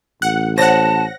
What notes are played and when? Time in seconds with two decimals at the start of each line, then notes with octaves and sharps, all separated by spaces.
0.22 A1 F#5
0.58 C5 C#5 F#5 A5 A#6